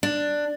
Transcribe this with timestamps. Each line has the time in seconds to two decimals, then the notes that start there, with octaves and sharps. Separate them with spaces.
0.03 D4